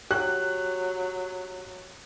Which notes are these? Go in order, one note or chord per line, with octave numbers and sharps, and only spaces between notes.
F#3 G4 F#6